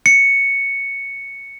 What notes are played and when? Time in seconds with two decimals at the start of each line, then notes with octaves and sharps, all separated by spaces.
0.06 C#7